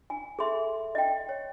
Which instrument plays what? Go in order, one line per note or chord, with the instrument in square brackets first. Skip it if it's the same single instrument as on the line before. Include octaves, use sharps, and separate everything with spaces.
[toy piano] G#5
[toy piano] G#4 C6 [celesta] A4 E5
[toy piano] D#5 G5
[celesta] C#5